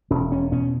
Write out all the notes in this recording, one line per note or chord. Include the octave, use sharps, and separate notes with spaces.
E1 C#4
E2 C#4
B2 C#4